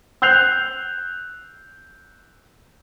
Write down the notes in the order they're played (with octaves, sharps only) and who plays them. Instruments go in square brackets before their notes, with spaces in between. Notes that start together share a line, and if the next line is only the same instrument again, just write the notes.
[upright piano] E6 F#6 G6 C7 F7